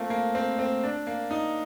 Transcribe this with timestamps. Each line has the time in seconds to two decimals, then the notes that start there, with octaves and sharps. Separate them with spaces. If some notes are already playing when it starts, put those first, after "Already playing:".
Already playing: A3 A#3 C4 F4
0.10 A#3
0.35 C4
0.59 C4
0.84 D4
1.07 A#3
1.31 D#4